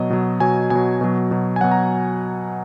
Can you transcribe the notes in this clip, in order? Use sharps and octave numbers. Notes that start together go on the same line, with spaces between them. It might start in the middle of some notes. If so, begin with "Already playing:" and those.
Already playing: B2 F#3 D#5
B2 F#3
B2 F#3 G#5
B2 F#3 G#5
B2 F#3
B2 F#3
G#5
B2 F#3 F#5
A#5